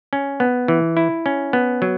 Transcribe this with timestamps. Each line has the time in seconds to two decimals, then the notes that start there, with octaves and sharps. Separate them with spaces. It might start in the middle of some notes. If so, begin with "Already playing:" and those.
0.13 C#4
0.40 B3
0.68 E3
0.97 E4
1.26 C#4
1.53 B3
1.82 F#3